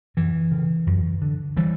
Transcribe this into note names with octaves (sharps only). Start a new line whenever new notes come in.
F#2 E3
C#3
F#2
D3
E3 G3